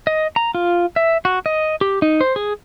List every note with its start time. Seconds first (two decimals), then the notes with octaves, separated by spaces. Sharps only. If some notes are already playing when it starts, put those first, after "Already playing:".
0.07 D#5
0.36 A#5
0.55 F4
0.96 E5
1.25 F#4
1.46 D#5
1.81 G4
2.02 D#4
2.21 C5
2.36 G#4